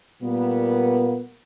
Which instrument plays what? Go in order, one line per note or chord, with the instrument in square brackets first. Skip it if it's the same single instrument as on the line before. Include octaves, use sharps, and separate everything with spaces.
[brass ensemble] A#2 G3 A#3 B3